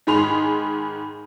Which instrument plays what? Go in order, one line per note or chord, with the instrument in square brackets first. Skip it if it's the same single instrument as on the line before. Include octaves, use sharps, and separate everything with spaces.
[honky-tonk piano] G#2 D#3 G#4 B5 C6 F7